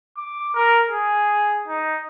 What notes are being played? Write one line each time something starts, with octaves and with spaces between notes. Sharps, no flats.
D6
A#4
G#4
D#4